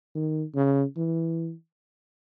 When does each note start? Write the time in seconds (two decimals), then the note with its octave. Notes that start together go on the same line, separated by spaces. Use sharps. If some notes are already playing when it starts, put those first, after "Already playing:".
0.15 D#3
0.55 C#3
0.96 E3